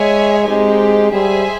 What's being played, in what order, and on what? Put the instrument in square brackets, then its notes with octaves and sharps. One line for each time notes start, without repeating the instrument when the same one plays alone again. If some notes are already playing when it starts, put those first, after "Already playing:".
Already playing: [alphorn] G#3 [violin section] G#4 C#5 E5 G#5
[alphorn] G#3 [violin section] C4 D#4 G4
[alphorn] G3 [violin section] G#4 C5 E5 G#5